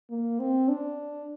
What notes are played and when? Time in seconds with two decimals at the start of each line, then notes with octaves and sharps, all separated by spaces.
0.10 A#3
0.39 C4
0.68 D4